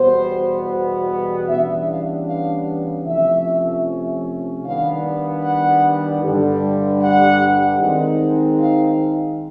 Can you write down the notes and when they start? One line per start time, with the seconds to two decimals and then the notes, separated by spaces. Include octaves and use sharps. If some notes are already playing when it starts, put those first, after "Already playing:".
Already playing: E2 B2 G3 B3 C5
1.48 C#3 E3 G3 B3 D4 E5
1.88 F5
2.27 F5
3.06 C3 F3 A3 C#4 E5
4.64 D#3 G3 B3 D4 F5
5.43 F#5
6.22 G2 D3 G3
7.01 F#5
7.79 D#3 G#3 C4 D#4
8.59 F5